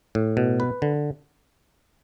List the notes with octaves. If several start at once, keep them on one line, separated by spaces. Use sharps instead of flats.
A2
B2
B4
D3